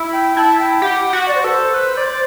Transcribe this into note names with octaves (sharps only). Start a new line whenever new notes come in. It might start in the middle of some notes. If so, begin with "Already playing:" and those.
Already playing: E4
G5
E4 A5
G5
G4 F#5
F#4
D5
C5
A4 B4
C5
B4
D5